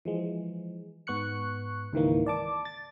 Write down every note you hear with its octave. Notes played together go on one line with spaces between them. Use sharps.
E3 F3 G#3
G#2 B3 C#6 F#6 C#7
C#2 G#2 D#3 E3 A#3
D5 A5 D6
A6